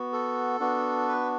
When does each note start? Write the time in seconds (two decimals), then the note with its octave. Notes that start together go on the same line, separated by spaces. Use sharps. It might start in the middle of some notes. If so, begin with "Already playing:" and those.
Already playing: B3 F#4
0.13 A4
0.60 B3 D4 F#4
1.08 B4